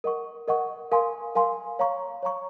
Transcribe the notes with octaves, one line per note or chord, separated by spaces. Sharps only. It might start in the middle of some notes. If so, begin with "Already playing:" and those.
A#4 D#5 F#5 C#6
A#4 D#5 F#5 C#6
A#4 F5 G#5 C6
A#4 F5 G#5 C6
C#5 F5 A#5 C#6
C#5 F5 A#5 C#6